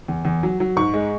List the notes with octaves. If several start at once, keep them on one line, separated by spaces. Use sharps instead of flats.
E2
E2
F#3
F#3
G#2 C#6
G#3